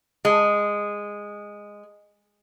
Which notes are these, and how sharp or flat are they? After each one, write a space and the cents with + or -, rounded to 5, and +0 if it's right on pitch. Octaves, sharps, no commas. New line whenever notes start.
G#3 -10